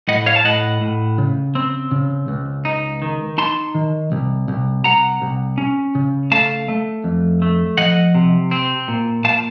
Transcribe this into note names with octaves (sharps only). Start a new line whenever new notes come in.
A2 D#5 F#5
C#5 F5
A5
A2 D#5 F#5
A2
C#3
C4
C#3
C#2
D#4
D#3
D#4 A5 C6
D#3
C2
C2
C2 F#5 A#5
C2
C#4
C#3
A3 F5 A5
A3
F2
A3
F3 D#5 F#5
C3
C4
A#2
A#2 F5 A5